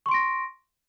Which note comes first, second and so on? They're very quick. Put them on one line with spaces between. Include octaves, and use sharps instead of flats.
C#6 C6 D7 A#6